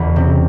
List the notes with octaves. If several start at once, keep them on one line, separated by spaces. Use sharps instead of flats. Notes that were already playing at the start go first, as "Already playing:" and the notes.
Already playing: F#1 E2 B4
C3